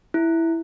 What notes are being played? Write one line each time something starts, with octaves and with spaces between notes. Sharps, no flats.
E4